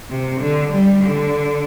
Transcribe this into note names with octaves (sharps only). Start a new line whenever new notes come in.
C3
D3
G3
D3